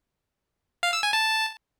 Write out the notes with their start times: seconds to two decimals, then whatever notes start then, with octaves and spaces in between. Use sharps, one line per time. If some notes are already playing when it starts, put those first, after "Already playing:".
0.83 F5
0.93 E6
1.03 G#5
1.13 A5